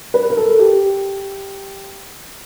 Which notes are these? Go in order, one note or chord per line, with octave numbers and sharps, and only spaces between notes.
B4
A#4
A4
G4